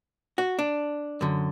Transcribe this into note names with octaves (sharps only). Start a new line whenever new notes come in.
F#4
D4
F#2 D3